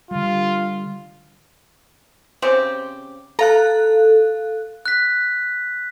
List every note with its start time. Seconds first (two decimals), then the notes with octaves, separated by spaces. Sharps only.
0.11 D3 G3 F4
2.42 C#3 C4 G4
3.39 A4 F5 A#5 F#6
4.86 F#6 B6